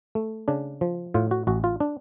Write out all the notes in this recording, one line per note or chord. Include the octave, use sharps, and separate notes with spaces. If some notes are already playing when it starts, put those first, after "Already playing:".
A3
C#3 D4
F3
A2 F4
F#4
A1 F#4
F4
D4